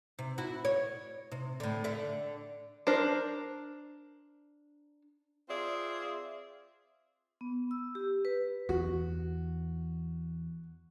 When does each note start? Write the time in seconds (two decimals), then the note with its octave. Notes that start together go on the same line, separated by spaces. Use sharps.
0.19 C3
0.38 E4 F#4
0.65 C#5
1.31 C3
1.60 A2 D3
1.84 D3 E5
2.87 D4 A#4 C5
5.48 C4 F4 G#4 D5 E5
7.41 B3
7.71 E6
7.95 G4
8.25 B4
8.69 E2 F#4